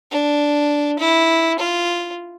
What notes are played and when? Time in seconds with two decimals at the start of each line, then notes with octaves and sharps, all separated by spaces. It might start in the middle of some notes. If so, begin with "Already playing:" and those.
0.11 D4
0.99 E4
1.59 F4